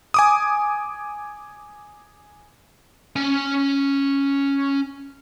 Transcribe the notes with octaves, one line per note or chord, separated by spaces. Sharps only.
G#5 D6 D#6
C#4 G#5